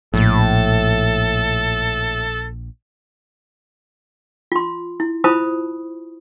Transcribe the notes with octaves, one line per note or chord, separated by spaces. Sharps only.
A#1 A2 A4
F4 C6
E4
E4 F4 C5 A5 B5 D#6